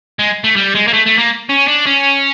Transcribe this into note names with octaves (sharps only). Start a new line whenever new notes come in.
G#3
A3
G3
G#3
A#3
A3
A3
A#3
C#4
D4
C#4